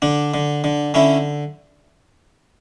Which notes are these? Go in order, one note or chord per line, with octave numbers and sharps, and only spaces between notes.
D3 D4
D3
D3
D3 C#4 E4